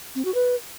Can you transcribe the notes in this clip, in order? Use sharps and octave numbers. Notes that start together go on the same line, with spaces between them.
C4
F#4
B4